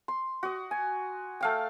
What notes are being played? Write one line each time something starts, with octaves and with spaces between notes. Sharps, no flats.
C6
F#4 D#5
G#5
A3 F5 G5